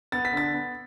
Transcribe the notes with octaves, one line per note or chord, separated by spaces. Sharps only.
B3 A6
B6
D3 A6
B3